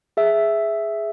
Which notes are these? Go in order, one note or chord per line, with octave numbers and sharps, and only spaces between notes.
G#4 E5